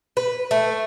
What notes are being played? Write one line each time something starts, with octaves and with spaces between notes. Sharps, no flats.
B4
A3